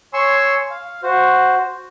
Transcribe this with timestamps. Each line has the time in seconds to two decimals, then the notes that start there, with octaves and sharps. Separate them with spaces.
0.13 C#5 G#5 C6 C#6 E6
0.70 F5
1.03 F#4 C5